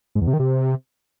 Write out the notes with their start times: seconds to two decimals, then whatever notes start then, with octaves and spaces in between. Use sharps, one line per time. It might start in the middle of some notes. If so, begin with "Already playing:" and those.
0.15 G#2
0.21 E2
0.27 C3
0.33 D#3
0.39 C3